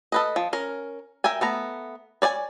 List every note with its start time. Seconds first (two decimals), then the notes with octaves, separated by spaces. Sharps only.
0.12 A4 B4 D#5
0.36 F3
0.53 C#4 A#4
1.24 A#4 E5 G5 G#5
1.41 A3 B3 A#5
2.22 C#5 D5 G5 G#5